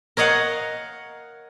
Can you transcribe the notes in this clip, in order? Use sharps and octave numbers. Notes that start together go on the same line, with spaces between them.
A#4 C#5 D#5 F5 F#5